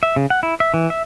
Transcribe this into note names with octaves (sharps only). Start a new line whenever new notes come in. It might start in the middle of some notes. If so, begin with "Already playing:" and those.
E5
C#3
F#5
E4
E5
E3
E5